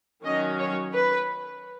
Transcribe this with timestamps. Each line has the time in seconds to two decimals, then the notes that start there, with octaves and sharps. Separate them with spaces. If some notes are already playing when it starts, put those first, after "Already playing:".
0.24 D#3 F#3 C#4 D#5
0.59 C#5
0.93 B4